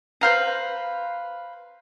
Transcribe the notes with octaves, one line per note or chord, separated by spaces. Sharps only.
B4 C5 F5 A#5